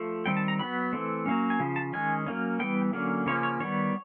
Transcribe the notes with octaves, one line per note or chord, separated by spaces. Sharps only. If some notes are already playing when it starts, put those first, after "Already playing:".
Already playing: F3 A3
D#3 G3 C4 G5
A5
A#5
F#3 B3 B5
E3 A3 C4
F#3 A#3 C#4
G#5
C#3 F3
A5
D#3 G#3 C#4 G#5
F#3 A#3 C#4
E3 G3 B3 G5
D3 F#3 A#3 C#4
C#3 F3 A#3 C#4 C#5
C#5
D#3 G3 B3 C#5